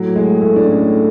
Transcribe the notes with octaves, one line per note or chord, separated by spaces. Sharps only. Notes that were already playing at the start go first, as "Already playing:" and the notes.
Already playing: A2 F#3
G#3
A3
D4
C#4